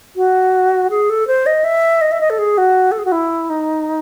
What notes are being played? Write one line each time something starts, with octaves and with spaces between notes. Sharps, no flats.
F#4
G#4
A4
C5
D#5
E5
D#5
E5
D#5
A4
G#4
F#4
A4
G#4
F#4
E4
D#4